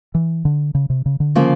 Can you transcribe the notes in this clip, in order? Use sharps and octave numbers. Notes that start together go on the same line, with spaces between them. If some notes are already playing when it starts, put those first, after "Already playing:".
E3
D3
C#3
C3
C#3
D3
C#3 F3 A#3